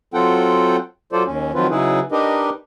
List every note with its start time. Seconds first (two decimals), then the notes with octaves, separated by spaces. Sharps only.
0.14 F#3 C4 F4 A4 F#5 G5
1.13 F#3 F4 A4 C5 D5
1.26 D#2 C#4
1.54 D#3 F3 F#3 C4 F4 B4
1.70 C#3 F#3 D#4 E4 G#4 B4
2.12 D4 D#4 G4 A#4 B4 D#5